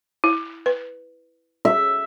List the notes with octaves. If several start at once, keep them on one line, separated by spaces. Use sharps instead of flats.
E4
B4
E5